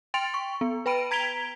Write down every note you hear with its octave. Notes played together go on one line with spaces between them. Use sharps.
G5 C6 A6 D7 F7
C#6
B3
B4 G5 B5 D7 D#7
A#5 G#6 B6 D7 F7 G7